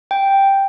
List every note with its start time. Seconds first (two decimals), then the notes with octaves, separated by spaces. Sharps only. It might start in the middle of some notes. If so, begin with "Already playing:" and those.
0.11 G5